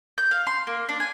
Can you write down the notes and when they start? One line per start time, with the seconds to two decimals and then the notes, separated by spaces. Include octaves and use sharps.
0.18 G6
0.31 F5
0.47 C6
0.67 A#3
0.89 D4
1.00 G#5